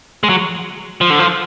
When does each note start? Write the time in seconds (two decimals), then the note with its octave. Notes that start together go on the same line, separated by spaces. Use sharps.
0.23 G#3
0.29 F#3
1.01 F3
1.10 D3
1.19 F3